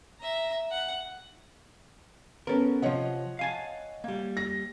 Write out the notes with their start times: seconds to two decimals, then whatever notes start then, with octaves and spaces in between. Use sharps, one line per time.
0.20 E5 A#5
0.71 F#5
2.47 B3 C#4 A4 A#4
2.82 C3 F3 C#5 D#5 F#5
3.39 F5 G#5 A5
4.04 G3 A#3
4.37 A#6